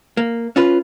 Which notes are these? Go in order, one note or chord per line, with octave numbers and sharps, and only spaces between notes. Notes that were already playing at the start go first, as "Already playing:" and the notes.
A#3
C#4 F4 B4